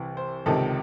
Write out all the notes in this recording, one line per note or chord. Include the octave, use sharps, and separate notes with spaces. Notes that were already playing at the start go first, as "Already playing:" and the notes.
Already playing: C2 C3 E3
C5
C#2 C3 D#3 A4